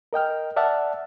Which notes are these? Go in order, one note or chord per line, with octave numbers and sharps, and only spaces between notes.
A#4 D#5 G5 F6
D5 E5 F#5 A5 F6